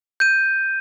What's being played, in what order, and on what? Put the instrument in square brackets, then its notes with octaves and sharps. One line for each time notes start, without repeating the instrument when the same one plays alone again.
[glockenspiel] G6 D#7